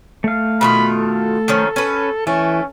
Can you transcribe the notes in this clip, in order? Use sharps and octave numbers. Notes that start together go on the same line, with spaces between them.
A3 F5
B2 D#3 F4 B5
A4
D#3 F3 C#4
C#4 B4
E3 A3 C#4